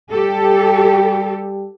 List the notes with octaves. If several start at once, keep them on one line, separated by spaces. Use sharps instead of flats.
G3 G4 A4